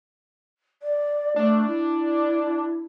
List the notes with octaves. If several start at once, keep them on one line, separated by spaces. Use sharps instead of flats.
D5
A3 D4
E4